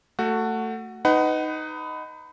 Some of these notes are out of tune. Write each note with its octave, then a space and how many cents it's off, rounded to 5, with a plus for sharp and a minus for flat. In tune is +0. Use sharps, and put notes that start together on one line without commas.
A3 +15 F#4 +0
D#4 +0 B4 +25 F#5 +20